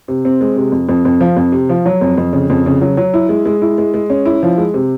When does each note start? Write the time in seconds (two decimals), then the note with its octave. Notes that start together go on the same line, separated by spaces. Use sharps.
0.08 C3
0.25 C4
0.41 G#3
0.56 C3
0.72 F2
0.89 F2
1.05 F2
1.21 F3
1.37 F2
1.52 C3
1.69 F3
1.86 F#3
2.01 F2
2.18 F2
2.33 C#3
2.50 F2
2.66 C#3
2.81 F#3
2.97 F#3
3.14 E4
3.29 G#3
3.45 G#3
3.62 E4
3.78 G#3
3.94 G#3
4.10 C#4
4.25 E4
4.43 F3
4.58 G#3
4.74 C3